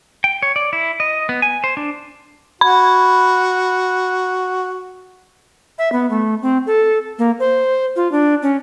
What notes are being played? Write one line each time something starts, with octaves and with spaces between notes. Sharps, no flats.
G5
C#5
D5
E4
D#5
B3
G#5
C5
D4
F#4 B5
E5
B3
A3
C4
A4
A#3
C5
F4
D4
C#4